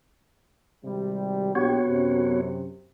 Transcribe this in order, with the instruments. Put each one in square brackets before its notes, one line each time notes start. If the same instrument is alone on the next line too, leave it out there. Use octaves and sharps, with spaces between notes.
[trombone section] G#1 C3 G3
[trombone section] A#1 G4 [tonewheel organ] B3 F#4 C#5
[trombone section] F#2 C3